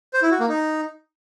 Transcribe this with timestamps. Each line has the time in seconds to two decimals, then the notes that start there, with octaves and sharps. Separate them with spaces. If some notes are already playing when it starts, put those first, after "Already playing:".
0.13 C5
0.22 E4
0.31 F#4
0.40 A#3
0.49 D#4